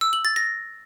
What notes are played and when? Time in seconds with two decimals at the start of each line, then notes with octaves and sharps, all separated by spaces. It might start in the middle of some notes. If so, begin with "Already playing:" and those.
0.01 E6
0.13 F#7
0.25 A6
0.36 A#6